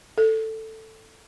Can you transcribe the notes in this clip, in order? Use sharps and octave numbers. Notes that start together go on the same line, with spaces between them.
A4